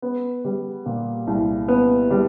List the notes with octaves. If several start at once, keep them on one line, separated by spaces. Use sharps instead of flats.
B3
G3
A#2
C2
B3
G3